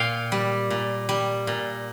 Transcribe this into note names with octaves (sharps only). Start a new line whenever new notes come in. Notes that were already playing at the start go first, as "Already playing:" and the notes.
Already playing: A#2 F5 G5
G3
A#2
G3
A#2